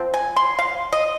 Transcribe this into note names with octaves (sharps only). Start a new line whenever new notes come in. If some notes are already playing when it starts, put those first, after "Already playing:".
Already playing: F3 C4
G#5
C6
F5
D#5